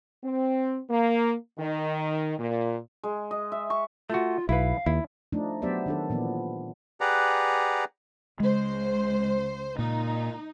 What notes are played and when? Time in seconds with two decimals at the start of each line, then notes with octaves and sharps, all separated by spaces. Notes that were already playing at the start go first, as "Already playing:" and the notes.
0.24 C4
0.89 A#3
1.59 D#3
2.39 A#2
3.03 G#3
3.31 D#5
3.52 E5
3.70 C#6
4.10 A3 F4 F#4
4.49 B1 E4 B4 F5
4.86 D#2 E4
5.33 F3 A3 D4 D#4
5.62 F#3 B3 G4 C5 D5 E5
5.86 D#3 D4 A4
6.10 A#2 E3 F3 B3
7.01 G4 G#4 B4 D5 F#5 A#5
8.40 C#2 G#3 C5
9.79 A#2 D#4